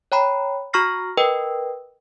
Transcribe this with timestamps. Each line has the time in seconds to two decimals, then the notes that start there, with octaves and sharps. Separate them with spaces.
0.12 C#5 G5 A#5 B5
0.73 F#4 A#5 C#6 F6 A#6 C7
1.17 A#4 B4 D#5 G5